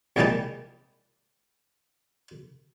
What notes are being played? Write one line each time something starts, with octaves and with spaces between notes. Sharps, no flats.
C2 A#2 E3 G3 D#4 A5